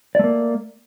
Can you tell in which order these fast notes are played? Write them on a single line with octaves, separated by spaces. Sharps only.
D5 A3 A#3